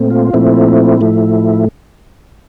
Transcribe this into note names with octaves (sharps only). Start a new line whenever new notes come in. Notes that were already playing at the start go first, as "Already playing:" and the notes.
Already playing: A#2 A3 C4
F4
A#2 F3 A3 C4 E4
A2 F3 A3